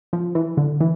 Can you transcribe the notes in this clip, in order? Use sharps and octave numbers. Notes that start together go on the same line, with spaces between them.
F3
E3
D3
E3